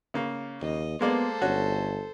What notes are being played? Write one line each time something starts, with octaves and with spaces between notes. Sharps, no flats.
C#3 A#3
D#2 D#5
G#3 A#3 B3 A4 C5 D5
G1 C#4 F#4